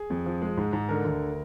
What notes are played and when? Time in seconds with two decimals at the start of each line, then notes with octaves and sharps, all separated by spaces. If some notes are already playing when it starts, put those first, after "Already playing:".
Already playing: G#4
0.10 F2
0.26 F3
0.42 G#3
0.57 G#2
0.73 G#2
0.89 D3 A#4
1.05 D2